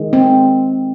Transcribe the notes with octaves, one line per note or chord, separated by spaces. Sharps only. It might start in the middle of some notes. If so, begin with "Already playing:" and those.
Already playing: D#3 G#3
C4